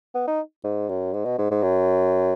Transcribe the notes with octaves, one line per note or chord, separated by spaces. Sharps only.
B3
D#4
G#2
F#2
G#2
B2
G#2
G#2
F#2